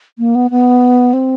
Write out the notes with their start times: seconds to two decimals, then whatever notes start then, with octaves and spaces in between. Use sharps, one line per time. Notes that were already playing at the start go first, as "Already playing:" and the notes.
0.19 A#3
0.35 B3
0.51 B3
1.13 C4